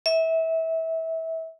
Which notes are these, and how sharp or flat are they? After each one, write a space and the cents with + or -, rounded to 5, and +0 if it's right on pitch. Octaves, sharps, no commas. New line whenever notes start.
E5 -25